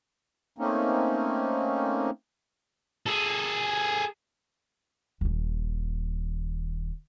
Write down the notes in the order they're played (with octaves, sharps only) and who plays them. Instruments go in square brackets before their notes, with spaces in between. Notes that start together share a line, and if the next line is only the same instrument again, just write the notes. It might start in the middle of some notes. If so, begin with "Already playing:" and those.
[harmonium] A3 A#3 C4 C#4 D#4
[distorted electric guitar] G#4 A4
[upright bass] D#1 D#2